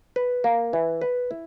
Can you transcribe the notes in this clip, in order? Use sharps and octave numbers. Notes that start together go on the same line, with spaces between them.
B4
A#3
E3
B4
E4